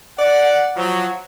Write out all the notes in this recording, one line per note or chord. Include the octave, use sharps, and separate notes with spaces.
D5 F#5
F3 F#3